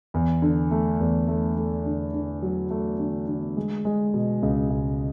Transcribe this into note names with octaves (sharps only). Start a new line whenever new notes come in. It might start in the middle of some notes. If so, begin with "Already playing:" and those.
E2
D3
A3
E2
A3
A3
D3
D3
F#3
A3
D3
D3
G#3
G#3
B2
C#2
C#2